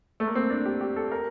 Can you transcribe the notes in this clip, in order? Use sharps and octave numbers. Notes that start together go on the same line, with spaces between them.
A3
A#3
C4
D4
G4
G4
A4
A#4